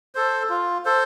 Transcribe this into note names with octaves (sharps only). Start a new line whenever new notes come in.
A4 C5
F4
A4 C5